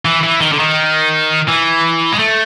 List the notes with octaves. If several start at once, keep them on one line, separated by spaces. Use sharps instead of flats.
E3
E3
D#3
D3
D#3
E3
G#3
A3